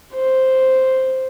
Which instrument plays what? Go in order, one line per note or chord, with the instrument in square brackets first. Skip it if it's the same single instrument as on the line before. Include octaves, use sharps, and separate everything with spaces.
[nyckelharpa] C5